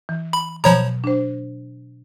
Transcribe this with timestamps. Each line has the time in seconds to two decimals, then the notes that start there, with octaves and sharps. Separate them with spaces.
0.09 E3
0.33 B5
0.64 B2 F3 F#3 C#5 A#5 B5
1.04 D4 C5